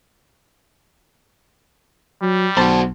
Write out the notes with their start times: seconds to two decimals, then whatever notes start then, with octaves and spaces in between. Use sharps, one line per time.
2.22 F#3 G3
2.57 B1 F#4 C5 A5